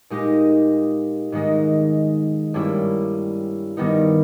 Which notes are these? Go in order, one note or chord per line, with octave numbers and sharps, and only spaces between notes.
A#2 G#3 D#4 G4
G#2 D#3 G#3 D#4
G2 G3 A#3 C#4 E4
G2 D#3 G3 B3 D#4